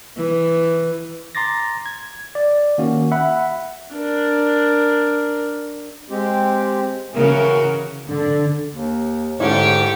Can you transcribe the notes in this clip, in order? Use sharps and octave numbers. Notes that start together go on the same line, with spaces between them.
E3
A#5 C6 D6 A6 A#6
G#6
D5
D#3 A#3 C#4 F#4
E5 F#5 B5
D4 A#4
G#3 C4 G4
C#3 E3 F#4 A#4
D3
D#2
G#2 D3 A3 C#4 E4 G4 C#6